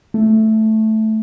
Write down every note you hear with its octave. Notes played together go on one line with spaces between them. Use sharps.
A3